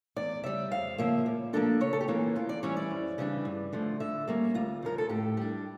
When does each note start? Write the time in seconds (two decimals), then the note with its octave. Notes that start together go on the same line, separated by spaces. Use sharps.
0.16 E2 D5
0.44 C#3 G3 E5
0.71 F2 F5
0.98 C#3 F3 A#3 E5
1.26 A#2
1.53 F3 A#3 D4 A4
1.81 C#3 C#5
1.93 A4
2.01 G4
2.08 E3 A#3 C#4 F4
2.35 E2 F4
2.49 D5
2.63 E3 G3 C#4 E4 C#5
2.77 D5
2.91 F2
3.18 C#3 E3 G3 D4
3.45 G2
3.73 D3 F3 A3
4.00 D3 E5
4.27 G3 A#3 C#4
4.54 D2 F4
4.82 C#3 F3 A#4
4.98 A4
5.09 A2 G4
5.37 G3 D4